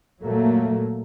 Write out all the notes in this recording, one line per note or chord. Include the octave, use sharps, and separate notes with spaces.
A#2 F#3 A3 A#3